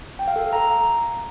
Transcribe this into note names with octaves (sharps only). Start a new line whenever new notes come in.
G5
F5
A4
F5
A#5